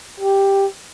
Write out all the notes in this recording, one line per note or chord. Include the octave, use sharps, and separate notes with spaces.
G4